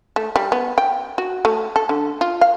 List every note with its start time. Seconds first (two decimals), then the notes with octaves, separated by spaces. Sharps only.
0.16 A3
0.36 G3
0.52 B3
0.78 G5
1.18 F#4
1.45 A3
1.76 A4
1.89 D3
2.21 F4
2.41 F5